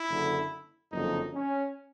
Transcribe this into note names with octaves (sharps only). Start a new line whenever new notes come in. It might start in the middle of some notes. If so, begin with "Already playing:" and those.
Already playing: E4
F#1 F#2 D3
F#1 F2 D3 F3 D#4
C#4